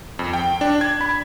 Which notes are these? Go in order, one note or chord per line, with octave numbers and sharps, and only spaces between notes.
F2
G5
D4
G#6
B5